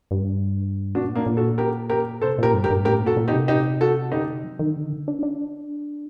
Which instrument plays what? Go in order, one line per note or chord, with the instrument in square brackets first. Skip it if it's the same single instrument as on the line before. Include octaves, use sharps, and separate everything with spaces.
[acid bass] G2
[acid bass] A#2 [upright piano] D4 F#4
[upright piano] A#3 D4
[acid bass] A#2
[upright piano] F#4 A4
G4 A#4
G4 A#4
[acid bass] C3 [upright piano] A4 C5
[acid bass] A#2 [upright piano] G4 A#4
[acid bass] G2
[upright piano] G4 A#4
[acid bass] G2
[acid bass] A2 [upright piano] G4 A#4
[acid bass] A#2
[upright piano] F#4 A4
[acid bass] A#2
[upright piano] D#4 G4
[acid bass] C3
[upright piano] D#4 G4
F#4 A4
[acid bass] D3 [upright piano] D#4 G4
[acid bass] C3
F#3
D#3
D3
D4
D4